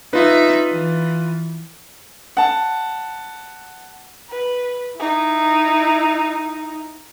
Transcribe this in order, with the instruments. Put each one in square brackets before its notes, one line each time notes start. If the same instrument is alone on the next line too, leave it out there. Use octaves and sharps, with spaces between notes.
[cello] D#4 E5 [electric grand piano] F4 B4
[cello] E3
[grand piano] F#5 A5
[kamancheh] B4
D#4 E4